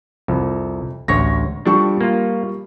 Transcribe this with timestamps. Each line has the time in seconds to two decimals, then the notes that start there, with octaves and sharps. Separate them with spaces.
0.28 C2 F2
1.08 A1 D2 C#5 A#6
1.66 F3 G3 D4 A4 G5 C#6
2.01 A#3 F4